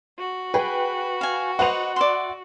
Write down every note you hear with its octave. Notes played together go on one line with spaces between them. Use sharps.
F#4
G#4 B4 G5
F5 G#5
B4 C5 D#5 F#5 F7
D5 E5 C6